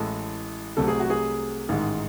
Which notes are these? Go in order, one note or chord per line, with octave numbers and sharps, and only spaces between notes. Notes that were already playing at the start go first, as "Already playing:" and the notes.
Already playing: A1 A2 E3 G#3 A4
C2 C3 F#3 A3 A4
G#4
F#4
G#4
A1 G#2 D#3 G#3